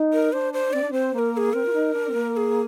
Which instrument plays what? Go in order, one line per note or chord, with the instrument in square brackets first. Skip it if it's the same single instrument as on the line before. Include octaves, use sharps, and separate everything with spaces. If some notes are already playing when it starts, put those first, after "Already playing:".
Already playing: [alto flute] D#4
[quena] A#4
[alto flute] D4 [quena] C5
[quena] C5
[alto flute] C4 [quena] D5
[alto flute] D4
[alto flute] C4 [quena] C5
[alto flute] A#3 [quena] C5
[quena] A#4
A#4
G#4
[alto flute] C4 [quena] A#4
[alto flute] F4
D#4
D4
C4
A#3
[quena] A#4
G#4